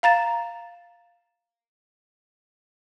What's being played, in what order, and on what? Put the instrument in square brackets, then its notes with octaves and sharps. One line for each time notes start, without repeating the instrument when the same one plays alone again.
[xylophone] F5 A#5 A6 E7